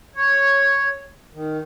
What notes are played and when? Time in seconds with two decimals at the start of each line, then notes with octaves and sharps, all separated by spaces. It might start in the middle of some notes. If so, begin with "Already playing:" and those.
0.15 C#5
1.33 D#3